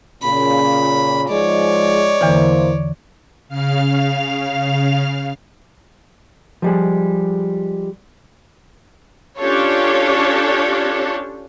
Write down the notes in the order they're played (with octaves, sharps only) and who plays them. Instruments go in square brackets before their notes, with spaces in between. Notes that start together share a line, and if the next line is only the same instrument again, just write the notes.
[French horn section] A#2 C#3 [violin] B5
[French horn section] G#2 F3 G#3 [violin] C#5 D5
[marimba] E2 D3 E3 [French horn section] A#3 E4 C5
[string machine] C#3 F5 F6
[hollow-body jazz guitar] F3 G3 G#3
[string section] C#4 D4 F4 G4 A4 C#5